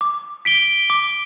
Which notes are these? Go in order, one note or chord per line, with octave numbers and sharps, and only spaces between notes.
D6
B6 D7 G7
D6